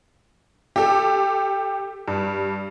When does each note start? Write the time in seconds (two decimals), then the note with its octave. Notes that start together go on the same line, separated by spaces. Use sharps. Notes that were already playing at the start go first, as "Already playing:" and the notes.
0.76 G4 A4
2.08 G2